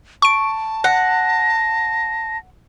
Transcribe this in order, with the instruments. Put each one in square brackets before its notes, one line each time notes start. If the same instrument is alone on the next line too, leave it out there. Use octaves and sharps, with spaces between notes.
[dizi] A5 [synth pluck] C#6 D7
[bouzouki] F#5 [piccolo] A#6